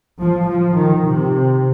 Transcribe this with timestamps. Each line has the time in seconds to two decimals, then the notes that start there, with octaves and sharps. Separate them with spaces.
0.20 F3
0.48 F3
0.76 D#3
1.05 C3